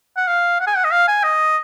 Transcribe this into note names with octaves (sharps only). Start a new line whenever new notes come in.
F#5
F5
F#5
G#5
F#5
D#5
F5
G#5
D#5